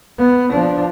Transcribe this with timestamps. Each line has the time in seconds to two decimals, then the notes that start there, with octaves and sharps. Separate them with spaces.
0.18 B3
0.53 F3 D4